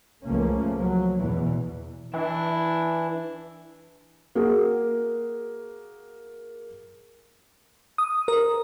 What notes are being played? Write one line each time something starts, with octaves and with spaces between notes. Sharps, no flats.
C#2 F3 A3 A#3 C#4
F#3
E2 B2 E3
E3 D4 E4
A#3 F#4 G#4
D#6
A#4